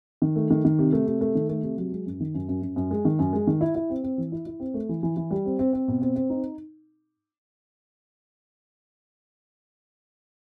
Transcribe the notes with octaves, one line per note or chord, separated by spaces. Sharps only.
D#3
A3
D#3
D#3
C3
A3
C3
A3
D#3
A3
C3
F#3
G#3
F#2
D#3
F#2
F#2
F#2
F#2
G#3
D#3
F#2
G#3
D#3
E4
E4
C4
C4
E3
E4
E4
C4
A3
E3
E3
E3
G3
C4
C4
C4
B2
C4
C4
D#4